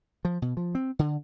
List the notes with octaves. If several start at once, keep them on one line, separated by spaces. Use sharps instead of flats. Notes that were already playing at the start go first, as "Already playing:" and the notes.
F3
B2
F3
C4
D3